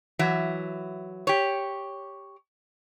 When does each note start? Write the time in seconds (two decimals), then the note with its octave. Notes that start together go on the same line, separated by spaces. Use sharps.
0.19 E3 F#3 E5
1.27 G4 C#5